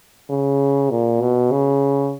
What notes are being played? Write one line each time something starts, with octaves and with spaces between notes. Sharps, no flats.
C#3
A#2
B2
C#3